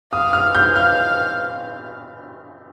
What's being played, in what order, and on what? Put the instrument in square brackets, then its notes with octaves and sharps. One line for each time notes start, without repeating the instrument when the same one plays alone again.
[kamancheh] F5 [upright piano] D#6
[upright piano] F6
G6
[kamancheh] F5 [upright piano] F6